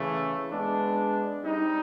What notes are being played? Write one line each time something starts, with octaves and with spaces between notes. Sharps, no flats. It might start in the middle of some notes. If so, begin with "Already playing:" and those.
Already playing: C#3 E3 A3
G#3 B3 D4
G3 C4 D#4